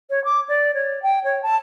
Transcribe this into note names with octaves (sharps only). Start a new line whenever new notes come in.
C#5
D6
D5
C#5
G5
C#5
A5